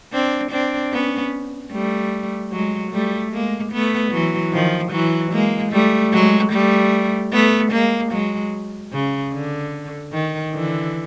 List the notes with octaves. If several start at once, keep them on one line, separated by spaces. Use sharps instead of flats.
C4 D4
C4 D4
B3 C#4
G3 A3
F#3 G#3
G3 A3
G#3 A#3
A3 B3
E3 F#3
D#3 F3
E3 F#3
G#3 A#3
G3 A3
F#3 G#3
G3 A3
A3 B3
G#3 A#3
F#3 G#3
C#3
D3
D#3
D3 E3